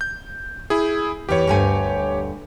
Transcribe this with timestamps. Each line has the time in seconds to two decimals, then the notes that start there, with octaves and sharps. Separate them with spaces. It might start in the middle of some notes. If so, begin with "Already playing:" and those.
0.01 G6
0.70 E4 G#4
1.29 E2 E3 G4 C#5
1.47 D2 G2 G#5